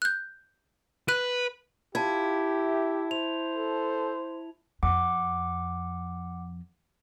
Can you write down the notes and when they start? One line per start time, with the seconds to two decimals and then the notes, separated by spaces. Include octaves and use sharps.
0.02 F#6 G6
1.08 B4 F#6 D#7
1.95 E4 F4 G4 A5 G#6
2.58 E5
3.11 C5 F7
3.55 A4
4.83 F2 F#5 D6